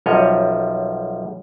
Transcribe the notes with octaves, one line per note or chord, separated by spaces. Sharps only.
B1 F#2 F3 G3 C#5 D#5